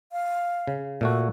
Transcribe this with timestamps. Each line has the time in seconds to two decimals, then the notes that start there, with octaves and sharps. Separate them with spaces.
0.12 F5
0.67 C#3
1.01 A#2 A3 F#4 A4